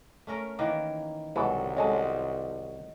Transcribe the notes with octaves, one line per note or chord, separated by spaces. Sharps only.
A3 C#4 A#4
D#3 E3 A#3
C2 B2 E3 F#3 G#3 A4
F#3 G#3 C#4 A4